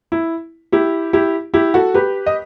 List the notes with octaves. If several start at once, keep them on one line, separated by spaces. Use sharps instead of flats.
E4
E4 G4
E4 G4
E4 G4
F#4 A4
G4 B4
D#5